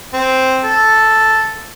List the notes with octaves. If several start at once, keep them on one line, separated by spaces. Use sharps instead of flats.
C4
A4